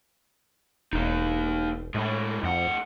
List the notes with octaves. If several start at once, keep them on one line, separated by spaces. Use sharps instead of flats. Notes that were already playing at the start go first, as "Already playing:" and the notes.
E1 A#3 D#4
A2 G#3 E4
F2 A2 F#5